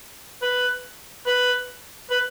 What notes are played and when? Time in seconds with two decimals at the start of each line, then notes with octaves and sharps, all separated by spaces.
0.42 B4
1.26 B4
2.10 B4